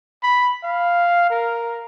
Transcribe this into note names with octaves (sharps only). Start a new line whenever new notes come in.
B5
F5
A#4